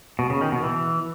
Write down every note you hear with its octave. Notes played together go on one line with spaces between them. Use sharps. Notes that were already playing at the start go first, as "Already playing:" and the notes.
B2
C#3
D#3
B2
E3